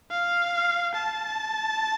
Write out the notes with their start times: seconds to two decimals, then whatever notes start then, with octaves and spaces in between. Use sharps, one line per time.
0.11 F5
0.95 A5